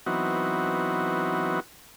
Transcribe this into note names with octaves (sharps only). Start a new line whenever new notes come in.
E3 F#3 B3 C4 D#4 F#4